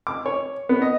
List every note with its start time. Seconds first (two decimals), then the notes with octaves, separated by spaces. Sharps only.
0.07 D6
0.26 C#5
0.69 B3
0.82 D#5